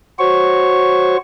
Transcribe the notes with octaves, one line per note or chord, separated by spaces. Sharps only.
F#4 C5 C#5 C#6